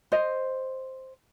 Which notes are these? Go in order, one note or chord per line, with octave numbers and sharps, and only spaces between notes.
C5 D#5